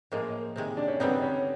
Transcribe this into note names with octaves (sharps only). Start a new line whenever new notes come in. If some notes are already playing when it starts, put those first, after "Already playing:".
A2 F3 G#3 A#3
C3 D#3 G#3
D4
C#4
D3 G3 B3 C4 D#4
C#4